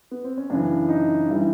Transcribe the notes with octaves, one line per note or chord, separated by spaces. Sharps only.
B3
C4
C#4
F#2 C#3 E3 D4
D#4
G2 E3 G3 E4